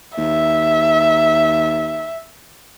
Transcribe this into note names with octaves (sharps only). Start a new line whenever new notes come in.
D#2 E5